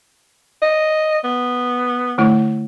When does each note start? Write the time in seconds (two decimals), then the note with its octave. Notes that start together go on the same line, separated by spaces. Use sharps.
0.62 D#5
1.24 B3
2.18 D3 A3 E4